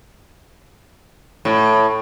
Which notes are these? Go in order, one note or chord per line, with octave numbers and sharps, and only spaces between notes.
A2